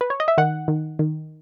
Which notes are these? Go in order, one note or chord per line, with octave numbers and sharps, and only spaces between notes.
B4
C#5
D#5
E5
D#3 F#5
D#3
D#3